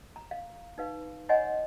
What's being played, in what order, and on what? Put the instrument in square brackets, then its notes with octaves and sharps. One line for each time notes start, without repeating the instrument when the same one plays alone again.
[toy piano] A#5
F5
D#4 B4 F5
C#5 D#5 F#5 G#5 A#5 C6